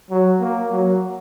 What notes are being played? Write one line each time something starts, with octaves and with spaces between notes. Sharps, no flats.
F#3
A#3
F#3